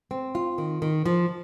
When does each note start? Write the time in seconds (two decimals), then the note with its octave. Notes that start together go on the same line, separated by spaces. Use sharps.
0.11 C4
0.35 F4
0.58 D#3
0.82 D#3
1.06 F3